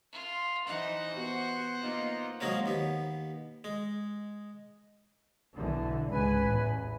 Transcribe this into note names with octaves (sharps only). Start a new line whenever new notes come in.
F4
E3 D#4 C5 F#5
B3 F#4 C5
A#3 D#4 F4
F3 F#3 G#3 A#3 C#4
D#2 B3
G#3
B1 D3 E3
C#2 G#2 B4 G#5
A1 E2